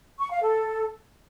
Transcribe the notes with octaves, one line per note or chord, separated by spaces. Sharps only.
C#6
F5
A4